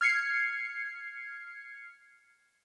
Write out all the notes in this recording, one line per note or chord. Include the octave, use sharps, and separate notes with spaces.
F6 G#6 C7 C#7